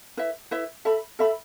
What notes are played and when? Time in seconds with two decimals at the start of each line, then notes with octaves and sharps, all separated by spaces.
0.17 E4 B4 E5
0.51 E4 B4 E5
0.85 A4 E5 B5
1.19 A4 E5 B5